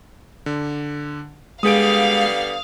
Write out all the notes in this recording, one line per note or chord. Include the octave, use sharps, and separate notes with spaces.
D3
D3 G3 G#3 B3 G#4 F5 D#6 D7